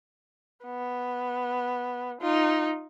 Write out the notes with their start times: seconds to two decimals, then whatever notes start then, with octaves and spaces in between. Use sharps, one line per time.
0.65 B3
2.22 D#4 F4